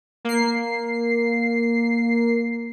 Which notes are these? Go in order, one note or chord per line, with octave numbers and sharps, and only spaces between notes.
A#3 C7